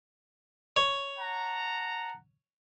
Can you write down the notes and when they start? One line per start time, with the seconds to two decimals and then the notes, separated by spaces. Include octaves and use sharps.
0.76 C#5
1.19 F#5 A5 A#5